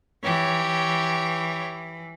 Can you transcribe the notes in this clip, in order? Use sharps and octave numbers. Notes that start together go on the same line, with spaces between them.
E3 G4 C#5